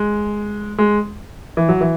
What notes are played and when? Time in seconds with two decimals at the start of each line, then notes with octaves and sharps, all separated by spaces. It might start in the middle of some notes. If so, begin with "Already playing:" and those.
Already playing: G#3
0.78 G#3
1.57 E3
1.69 F#3
1.81 E3